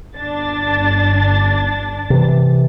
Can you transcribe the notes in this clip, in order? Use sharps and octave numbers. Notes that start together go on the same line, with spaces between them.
G1 D4 A6
C3 E3